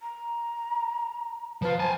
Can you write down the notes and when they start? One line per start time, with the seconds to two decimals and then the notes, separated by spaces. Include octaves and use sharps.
0.01 A#5
1.62 F3 F4 B4
1.80 C5 G#5 A5